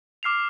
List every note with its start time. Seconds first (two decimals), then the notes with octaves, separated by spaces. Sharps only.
0.23 D6 F6 C7 F7